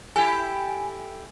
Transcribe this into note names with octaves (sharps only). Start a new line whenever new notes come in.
E4 G4 A4 G#5